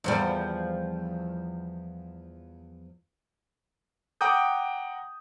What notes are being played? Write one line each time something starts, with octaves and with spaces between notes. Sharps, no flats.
E2 F3 G3
F#5 G5 A#5 D6 D#6 G6